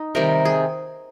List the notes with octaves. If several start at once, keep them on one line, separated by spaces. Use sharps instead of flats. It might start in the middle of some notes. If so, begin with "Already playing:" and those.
Already playing: D#4
C3 D#3 G3 A#4
G#4